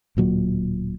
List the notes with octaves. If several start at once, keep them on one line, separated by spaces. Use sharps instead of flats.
D1 A#2 F#3